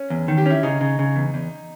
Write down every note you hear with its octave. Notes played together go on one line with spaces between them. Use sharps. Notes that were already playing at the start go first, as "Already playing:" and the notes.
Already playing: C#4
E2
D#3
G4
C#4 E4
C#3 D#4
C#3
C#3
E2
E2